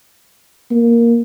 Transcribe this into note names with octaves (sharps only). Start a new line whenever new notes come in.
A#3